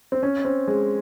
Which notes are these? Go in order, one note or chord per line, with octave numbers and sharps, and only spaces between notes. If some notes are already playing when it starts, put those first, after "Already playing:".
C4
C#4
C4
G#3